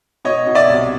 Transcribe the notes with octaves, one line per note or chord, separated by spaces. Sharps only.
B2 C#5 D#5
B2
D5 E5
C2